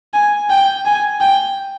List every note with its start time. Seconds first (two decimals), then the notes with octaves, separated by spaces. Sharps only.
0.14 G#5
0.50 G5
0.86 G#5
1.21 G5